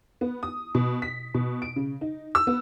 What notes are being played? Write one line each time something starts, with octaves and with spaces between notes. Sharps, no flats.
B3
D#6
B2
B6
B2
D7
C#3
D#4
E6
B3